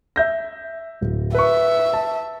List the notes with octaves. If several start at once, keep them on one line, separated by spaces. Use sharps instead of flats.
E5 G6 A#6
D1
B4 E5 C#6
A5